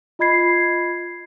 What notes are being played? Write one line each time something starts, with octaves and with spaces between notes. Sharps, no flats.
F4 D#5 B5 G#6 C7